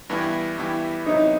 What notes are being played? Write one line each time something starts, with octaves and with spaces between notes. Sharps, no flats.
G2 E3 B3 E4 G4
G2 E3 B3 E4 G4
C3 F#3 B3 D#4 E4